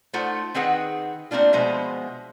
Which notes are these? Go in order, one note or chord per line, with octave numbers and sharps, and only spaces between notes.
A3 D#4 F4 C5 F#5 A5
D#3 C4 G#4 B4 F#5
A3 A#3 C4 D4 F4
B2 F3 G#3 B3 C5 E5